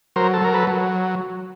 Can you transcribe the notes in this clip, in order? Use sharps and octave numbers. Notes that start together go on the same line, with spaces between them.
F#3 A#4 C5
A4
F#3 A#4
A4 B4
F#3